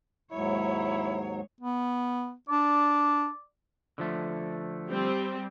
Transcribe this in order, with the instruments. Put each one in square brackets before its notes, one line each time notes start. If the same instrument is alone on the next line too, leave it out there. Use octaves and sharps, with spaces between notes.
[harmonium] D#2 G#2 F#3 [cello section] G#3 C#5 [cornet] E4
[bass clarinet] B3
[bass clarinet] D4 [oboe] D5
[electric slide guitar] D3 F3 A3
[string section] G3 C4